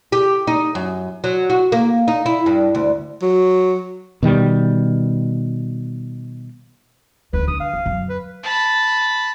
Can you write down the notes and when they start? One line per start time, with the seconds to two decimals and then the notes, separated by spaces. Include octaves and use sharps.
0.12 G4
0.47 D#4
0.75 F#2
1.24 F#3
1.50 F#4
1.72 A#3
2.08 D#4
2.26 E4
2.46 G2
2.75 D2
3.22 F#3
4.23 B2 D#3 G3
7.33 D2 D#3 B4
7.48 D4 D#6
7.60 F5
7.73 C#2
7.86 F#2
8.09 B4
8.44 A5 B5